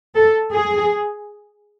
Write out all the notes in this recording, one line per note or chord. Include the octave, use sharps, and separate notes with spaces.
A4
G#4